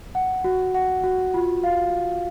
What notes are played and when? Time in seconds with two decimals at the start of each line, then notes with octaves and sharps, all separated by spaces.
0.15 F#5
0.44 F#4
0.74 F#5
1.04 F#4
1.34 F4
1.64 F5